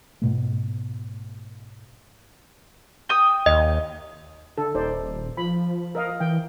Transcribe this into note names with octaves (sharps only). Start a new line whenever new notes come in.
G#2 B2 A3
G5 D#6
D#2 D#5
D3 A4
D#1 D#4 C5 D5
F3 B5
A#4 D#5 F5
E3 G5